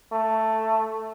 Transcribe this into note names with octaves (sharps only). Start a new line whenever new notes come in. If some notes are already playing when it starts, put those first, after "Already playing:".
A3